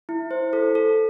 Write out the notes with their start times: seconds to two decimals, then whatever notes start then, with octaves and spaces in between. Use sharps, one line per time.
0.09 E4
0.31 C5
0.53 A4
0.75 A4